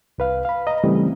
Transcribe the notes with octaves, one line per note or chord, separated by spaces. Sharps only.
C2 B4 F5
F5 B5
D#5 A#5
C#3 E3 G3 A3 C4